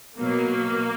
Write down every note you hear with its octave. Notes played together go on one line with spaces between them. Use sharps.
B2 F#3 A#3